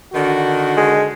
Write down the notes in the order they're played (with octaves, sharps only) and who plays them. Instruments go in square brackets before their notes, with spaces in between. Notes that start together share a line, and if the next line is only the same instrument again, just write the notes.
[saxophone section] D3 D#3 [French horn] F#4
[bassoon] G#3